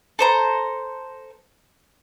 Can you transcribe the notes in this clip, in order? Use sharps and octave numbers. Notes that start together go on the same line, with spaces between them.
A4 C5 A#5